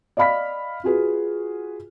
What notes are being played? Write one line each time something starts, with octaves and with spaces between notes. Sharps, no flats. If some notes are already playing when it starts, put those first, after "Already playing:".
D5 D#5 F5 B5 F6 B6
F4 F#4 G#4 B4